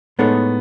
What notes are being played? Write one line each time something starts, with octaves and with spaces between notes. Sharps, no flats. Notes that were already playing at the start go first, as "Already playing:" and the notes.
A2 G#3 B3 D#4 A4 C#5